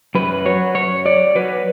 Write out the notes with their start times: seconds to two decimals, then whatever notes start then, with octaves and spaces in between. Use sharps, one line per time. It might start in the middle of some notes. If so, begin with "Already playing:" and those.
0.15 F#2 B4
0.45 F#3 C#5
0.75 F#2 C#5
1.05 F#3 D5
1.35 F#3 B4